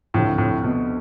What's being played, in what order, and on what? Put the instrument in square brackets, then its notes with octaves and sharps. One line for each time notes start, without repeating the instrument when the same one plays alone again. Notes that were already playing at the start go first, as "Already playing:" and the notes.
[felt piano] D2 C3 F3 [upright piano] A2
[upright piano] A2
B2